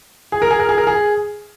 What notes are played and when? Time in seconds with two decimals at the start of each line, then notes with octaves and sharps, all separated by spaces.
0.32 G#4
0.42 A#4
0.51 G#4
0.60 A#4
0.69 G#4
0.78 A#4
0.87 G#4